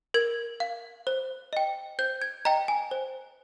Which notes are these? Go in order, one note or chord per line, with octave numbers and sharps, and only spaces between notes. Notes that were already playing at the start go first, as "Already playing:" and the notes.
A#4 G#6
F5
C5
D#5 G5
C5 G6
G#6
D#5 G5 A#5
G#5
C5